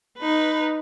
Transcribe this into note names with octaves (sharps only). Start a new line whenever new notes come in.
D#4 B4